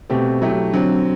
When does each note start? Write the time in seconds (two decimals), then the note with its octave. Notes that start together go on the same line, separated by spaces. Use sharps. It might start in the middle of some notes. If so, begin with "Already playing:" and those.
0.10 B2 A3 C4 G4
0.42 F#3 A3 E4 G4
0.73 D3 F#3 C4